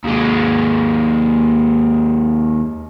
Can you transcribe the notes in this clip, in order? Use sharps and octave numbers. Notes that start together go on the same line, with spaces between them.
D#2 G#3